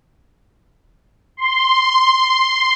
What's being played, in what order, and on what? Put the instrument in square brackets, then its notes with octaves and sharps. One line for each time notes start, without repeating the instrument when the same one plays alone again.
[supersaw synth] C6